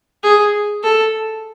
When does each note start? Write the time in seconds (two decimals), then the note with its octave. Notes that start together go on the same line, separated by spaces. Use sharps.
0.23 G#4
0.84 A4